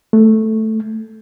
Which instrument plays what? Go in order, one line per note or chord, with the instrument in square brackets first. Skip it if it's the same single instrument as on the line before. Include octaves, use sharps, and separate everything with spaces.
[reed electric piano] A3